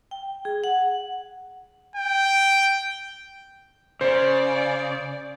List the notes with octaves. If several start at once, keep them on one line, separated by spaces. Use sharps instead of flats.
G5
G#4
F#5
G5
C#3 C5 D5